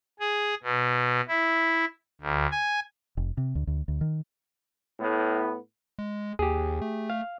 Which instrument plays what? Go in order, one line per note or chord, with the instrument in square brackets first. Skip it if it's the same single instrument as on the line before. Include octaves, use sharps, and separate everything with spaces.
[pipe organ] G#4
B2
E4
D2
G#5
[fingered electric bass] F1
C3
D2
D2
D2
D#3
[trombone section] A2 B3
[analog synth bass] G#3
[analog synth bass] D#2 [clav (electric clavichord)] G4 G#4
[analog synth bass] A3
[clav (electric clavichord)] F5